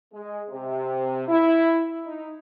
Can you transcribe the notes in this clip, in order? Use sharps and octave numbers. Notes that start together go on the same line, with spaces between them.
G#3
C3
E4
D#4